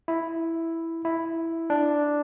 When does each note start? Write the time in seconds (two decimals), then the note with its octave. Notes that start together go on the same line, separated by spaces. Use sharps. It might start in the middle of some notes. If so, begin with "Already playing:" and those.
0.08 E4
1.05 E4
1.70 D4